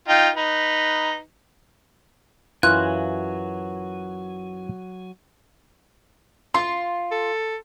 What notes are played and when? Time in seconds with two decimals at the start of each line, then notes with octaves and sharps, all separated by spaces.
0.08 D#4 F4 G5
0.36 D#4 B4
2.63 F#2 E3 F#3 F4 F#4 G#5 F#6
6.54 F4 C6
7.11 A4